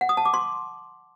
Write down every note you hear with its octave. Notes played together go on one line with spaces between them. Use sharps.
F#5
D#6
A5
D6
C6